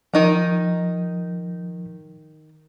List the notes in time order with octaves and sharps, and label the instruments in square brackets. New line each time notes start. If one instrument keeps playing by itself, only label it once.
[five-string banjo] D#3 D#4 A#5 [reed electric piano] F3